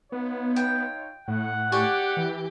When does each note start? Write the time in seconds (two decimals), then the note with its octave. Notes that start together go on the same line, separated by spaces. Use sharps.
0.12 B3 D#4 F4 C#5
0.56 G5
1.28 A2 F#5
1.72 G4 D5 G#5 C#6
2.17 E3